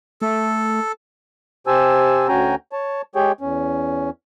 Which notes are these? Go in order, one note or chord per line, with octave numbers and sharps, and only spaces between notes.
A3 A4
C3 G4 C5 G#5 A5 E6
D2 C#4 F#4 G5 G#5 A#5
C#5 A5
G#3 G4 G#4 C#5 G5
E2 C#4